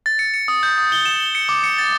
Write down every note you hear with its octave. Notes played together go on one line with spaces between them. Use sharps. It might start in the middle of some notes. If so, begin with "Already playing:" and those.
A6
C#7
C#7
D#6
G6
D#6
G7
E7
G7
C#7
D6
C#7
A6